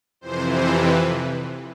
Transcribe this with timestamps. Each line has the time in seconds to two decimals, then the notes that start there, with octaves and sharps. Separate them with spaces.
0.21 F2 C3 E3 C5
0.50 C5
0.78 B4